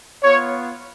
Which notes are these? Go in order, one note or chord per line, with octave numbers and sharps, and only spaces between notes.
B3 F4 C#5